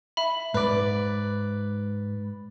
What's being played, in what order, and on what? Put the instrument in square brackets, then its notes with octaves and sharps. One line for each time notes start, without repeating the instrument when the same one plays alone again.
[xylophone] E5 B5
[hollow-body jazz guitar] G#2 [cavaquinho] B4 D5